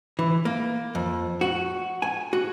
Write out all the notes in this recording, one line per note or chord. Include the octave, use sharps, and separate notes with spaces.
E3
A#3
F2
F#4
G#5
F#4